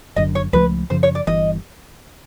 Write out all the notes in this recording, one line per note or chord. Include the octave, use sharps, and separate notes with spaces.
F#1 F#2 D3 D#5
C#5
C#2 C#3 F3 A3 B4
F#2 C#3 F3 C5
C#5
D5
G1 G2 E3 D#5